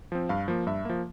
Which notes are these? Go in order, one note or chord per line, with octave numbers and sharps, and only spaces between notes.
F3 C4
G2 F5
F3 A#3
G2 E5
F3 A#3